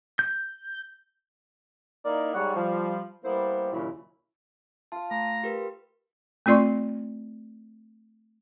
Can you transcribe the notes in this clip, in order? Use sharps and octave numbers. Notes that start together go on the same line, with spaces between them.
G6
A#3 D#4 E4 A#4 D5
G#2 G3 C#5 F#5
F3 G3
G3 A#3 B3 E4 C5
D#2 A#2 C#3 F#3 E4
F4 F5 A5
A3 A#5
G4 A#4 B4
A3 C4 F4 D5 C6 C#6